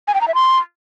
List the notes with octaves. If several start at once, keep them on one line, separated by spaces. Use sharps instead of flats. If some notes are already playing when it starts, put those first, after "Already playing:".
G#5
G5
A#5
E5
C6